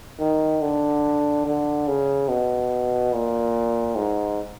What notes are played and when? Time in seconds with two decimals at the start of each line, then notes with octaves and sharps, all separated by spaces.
0.20 D#3
0.62 D3
1.46 D3
1.88 C#3
2.29 B2
3.13 A#2
3.96 G#2